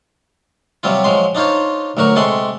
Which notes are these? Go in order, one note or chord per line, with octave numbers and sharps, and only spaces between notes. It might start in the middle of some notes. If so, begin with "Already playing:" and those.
C3 F#3 G3 C4 F4
F3 F#3 G#3 C6
D4 D#4 F4 C5 C#5
D2 F#3 F#4 A#4 C#6
C3 G#3 A4 F#5 C6 C#6